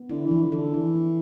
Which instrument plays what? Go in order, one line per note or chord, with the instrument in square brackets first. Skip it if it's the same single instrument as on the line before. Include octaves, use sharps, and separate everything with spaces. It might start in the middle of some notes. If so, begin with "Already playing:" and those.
Already playing: [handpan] B3
[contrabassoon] D3 [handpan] E4
[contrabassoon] E3
[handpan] F3
[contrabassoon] D3
[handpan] A4
[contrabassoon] D3
[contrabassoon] E3 [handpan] E4
[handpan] B3